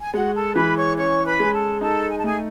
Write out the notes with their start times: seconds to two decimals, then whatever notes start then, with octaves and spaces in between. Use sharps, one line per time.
0.02 G#5
0.13 G#3 F#4 F#5
0.34 A4 A5
0.55 E3 B4 B5
0.76 C#5 C#6
0.97 C#4 C#5 C#6
1.25 B4 B5
1.40 G#3 G#5
1.53 A4 A5
1.81 D#4 A4 A5
2.09 G#5
2.17 A5
2.24 A3 G#4 G#5